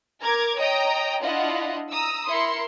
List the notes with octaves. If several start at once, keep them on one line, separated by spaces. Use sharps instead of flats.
A#4 A#5 D6 G#6
C#5 D#5 G5 A#5 D#6
D4 E4 F4 D#5 F#5
A#5 D#6 E6
E4 A#4 C6 C#7